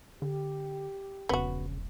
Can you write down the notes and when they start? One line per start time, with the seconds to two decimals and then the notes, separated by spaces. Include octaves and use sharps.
0.22 D3 G4
1.29 E1 A#1 C#3 B3 F#4